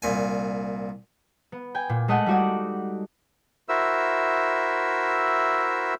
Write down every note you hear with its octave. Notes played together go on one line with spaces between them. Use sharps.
C2 A#2 G#5
B3
G5 G#5
A#2
G#3 A3 A4 D#5 F#5
G3 D#4 F#4 D5 F#5
E4 F#4 A#4 C5 E5 E6